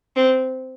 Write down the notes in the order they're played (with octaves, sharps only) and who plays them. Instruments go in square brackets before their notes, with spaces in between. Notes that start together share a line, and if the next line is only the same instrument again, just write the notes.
[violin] C4